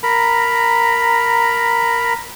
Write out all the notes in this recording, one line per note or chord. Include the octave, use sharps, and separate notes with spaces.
A#4 A#5 B5